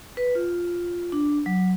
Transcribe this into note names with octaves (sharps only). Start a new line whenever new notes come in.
B4
F4
D4
F#3